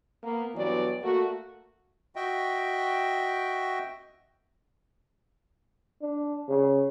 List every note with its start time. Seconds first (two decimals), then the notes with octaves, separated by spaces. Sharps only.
0.23 A#3 B3
0.55 G2 E3 F#3 B3 D5
1.02 A3 A#3 F#4
2.16 F#4 D#5 E5 G5
6.02 D4
6.48 C#3